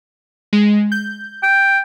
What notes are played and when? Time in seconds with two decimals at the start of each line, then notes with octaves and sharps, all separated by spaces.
0.53 G#3
0.92 G6
1.43 G5